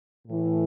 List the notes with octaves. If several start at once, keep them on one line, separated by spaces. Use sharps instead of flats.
A2 E3